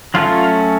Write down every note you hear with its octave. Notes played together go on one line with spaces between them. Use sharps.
F#3 A3 C#4 F4